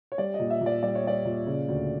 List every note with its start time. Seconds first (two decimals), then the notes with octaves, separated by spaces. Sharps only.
0.12 C#5
0.18 G3 D5
0.34 D#5
0.40 A#2
0.50 E5
0.61 A#2 D5
0.83 G3 D5
0.95 C#5
1.04 G3 D5
1.25 A#2
1.47 C#3
1.68 D2